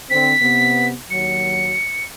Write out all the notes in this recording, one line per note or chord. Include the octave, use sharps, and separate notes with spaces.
D3 C4 B6
C3 B3
D#2 F#3 C#7